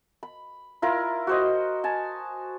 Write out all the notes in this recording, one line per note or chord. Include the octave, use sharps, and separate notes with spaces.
B5
E4 F4 A#4
F#4 C5 D#5
G#5 A5